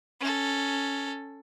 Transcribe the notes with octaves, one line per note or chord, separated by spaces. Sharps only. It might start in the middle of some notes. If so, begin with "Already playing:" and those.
C#4 A4